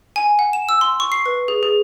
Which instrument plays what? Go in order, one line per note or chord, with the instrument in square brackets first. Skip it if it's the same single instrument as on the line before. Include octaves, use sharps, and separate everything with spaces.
[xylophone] G#5
F#5
E7
E6
C6
C#6
C7
B4
G#4
G#4